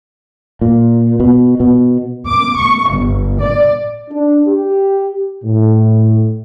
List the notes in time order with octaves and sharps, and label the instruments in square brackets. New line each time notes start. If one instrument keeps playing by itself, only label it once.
[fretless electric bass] A#2
B2
B2
[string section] D6
C#6
G1
D5
[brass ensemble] D4
G4
A2